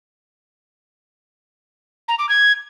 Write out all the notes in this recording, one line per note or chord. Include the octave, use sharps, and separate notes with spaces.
A#5
D6
G#6